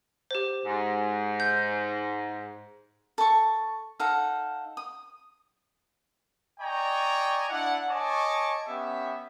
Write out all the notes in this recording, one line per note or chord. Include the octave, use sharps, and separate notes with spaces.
G4 C5
G#2
G6
A4 C#6
D#4 A4 F5 F#5
D#6
D5 D#5 G5 G#5 A#5 C#6
D4 E4 D5 F#5
C#5 D#5 G#5 A5 C#6 D6
B3 C#4 G4 E5